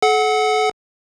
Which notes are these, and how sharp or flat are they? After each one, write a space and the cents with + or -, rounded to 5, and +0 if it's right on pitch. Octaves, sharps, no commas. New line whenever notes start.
A4 -40 F#5 +0